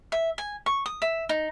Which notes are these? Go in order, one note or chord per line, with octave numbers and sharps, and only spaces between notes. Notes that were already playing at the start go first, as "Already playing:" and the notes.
E5
G#5
C#6
D#6
E5
D#4